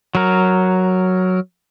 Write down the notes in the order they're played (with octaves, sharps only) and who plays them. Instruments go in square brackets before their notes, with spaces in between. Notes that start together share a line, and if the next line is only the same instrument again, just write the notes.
[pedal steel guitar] F#3 A#4